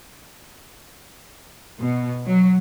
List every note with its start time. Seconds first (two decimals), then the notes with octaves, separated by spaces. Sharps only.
1.80 B2
2.28 F#3